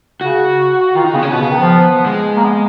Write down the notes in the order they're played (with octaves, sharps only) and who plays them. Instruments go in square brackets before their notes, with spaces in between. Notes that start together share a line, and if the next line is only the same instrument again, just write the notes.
[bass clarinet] C#3 [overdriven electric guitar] F#4
[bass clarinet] D#3 [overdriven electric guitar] F4
[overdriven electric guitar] D#4
[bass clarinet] C#3 [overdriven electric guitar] B3
[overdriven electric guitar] C#4
[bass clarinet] B2 [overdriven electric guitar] B3
[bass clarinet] C#3
D#3
F3
[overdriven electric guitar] G#3
[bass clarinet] A#3
B3